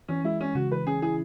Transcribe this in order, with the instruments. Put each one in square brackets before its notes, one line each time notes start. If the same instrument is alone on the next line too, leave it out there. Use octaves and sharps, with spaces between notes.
[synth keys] E3 [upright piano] C#4
[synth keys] G#3 [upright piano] E4
[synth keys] G#3 [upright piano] C#4
[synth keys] C#3 [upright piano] F#4
[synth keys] E3 [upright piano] B4
[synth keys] C#4 [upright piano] G#4
[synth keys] E4 [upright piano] G#4